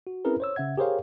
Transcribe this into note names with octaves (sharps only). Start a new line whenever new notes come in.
F#4
C4 C#4 E4 G#4 A#4 B4
C5 C#5 E6
C#3 C#4 E5 F#5 G#6
G4 G#4 A#4 C5 C#5 F5